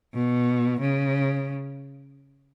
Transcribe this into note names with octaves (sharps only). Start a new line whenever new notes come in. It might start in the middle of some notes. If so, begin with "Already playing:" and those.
B2
C#3